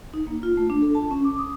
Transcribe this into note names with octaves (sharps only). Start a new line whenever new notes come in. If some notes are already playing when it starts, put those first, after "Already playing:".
D#4
A#3
F4
A3
D4
A4
A5
C#4
D6
D#6